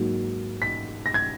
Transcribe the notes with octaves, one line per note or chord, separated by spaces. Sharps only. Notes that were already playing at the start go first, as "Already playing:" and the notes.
Already playing: G#2 F#3 A#3
B6
A#6
G#6